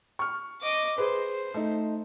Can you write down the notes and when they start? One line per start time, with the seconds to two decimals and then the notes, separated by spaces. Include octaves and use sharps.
0.19 C#6 F6
0.62 D#5 D6
0.98 G#4 B4 C5
1.54 A3 D#4